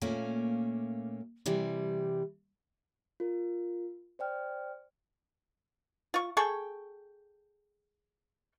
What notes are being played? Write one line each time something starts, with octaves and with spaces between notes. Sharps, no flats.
A#2 A3 A#3 C#4
C3 E3 G3
F4 A#4
C5 D5 G5 F6
F4 C#6
G#4 A4 G5 C#6